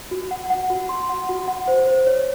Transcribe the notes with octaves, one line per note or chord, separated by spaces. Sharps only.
F#4
F#5
F#5
F#4
C6
F#5
F#4
F#5
C5
C5
C#5